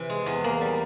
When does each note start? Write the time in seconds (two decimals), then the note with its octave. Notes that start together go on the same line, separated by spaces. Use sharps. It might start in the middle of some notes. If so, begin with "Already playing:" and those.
Already playing: C3 E3
0.10 G#3
0.26 E2
0.44 A#3
0.61 G3